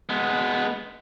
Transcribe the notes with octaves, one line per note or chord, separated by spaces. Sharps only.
G#3 B3